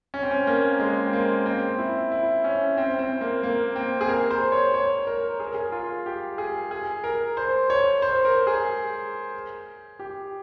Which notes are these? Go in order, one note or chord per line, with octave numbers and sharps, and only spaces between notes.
C#4
C4
C#4
A#3
G#3
C4
A#3
C4
E4
E4
C#4
C4
C4
A#3
A#3
C4
G#4
A#4
C5
C#5
C#5
A#4
G#4
A#4
G#4
F4
G4
G#4
G#4
A#4
C5
C#5
C5
A#4
G#4
G4